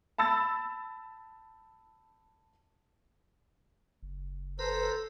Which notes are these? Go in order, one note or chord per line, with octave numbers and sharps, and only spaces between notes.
A5 B5 E6 A6
F#1
A4 B4 C5 A#5